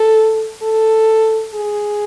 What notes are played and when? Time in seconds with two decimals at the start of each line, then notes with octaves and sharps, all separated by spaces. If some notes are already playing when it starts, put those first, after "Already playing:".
Already playing: A4
0.62 A4
1.54 G#4